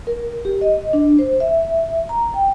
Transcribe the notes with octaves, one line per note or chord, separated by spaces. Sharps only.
A#4
G4
D#5
D4
C5
E5
A#5
G5